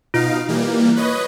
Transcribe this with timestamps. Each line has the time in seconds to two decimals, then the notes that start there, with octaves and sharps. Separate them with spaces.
0.14 B2 D#4 F4 F5
0.49 E3 G3 A#3
0.96 B4 C#5 D#5